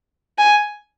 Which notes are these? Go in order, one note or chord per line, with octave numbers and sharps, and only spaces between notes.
G#5